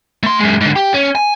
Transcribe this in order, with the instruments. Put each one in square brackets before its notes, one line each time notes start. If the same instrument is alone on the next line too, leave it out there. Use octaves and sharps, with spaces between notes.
[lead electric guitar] A3 C6
F#2 G#3
G#2 D3
G4
C#4
G#5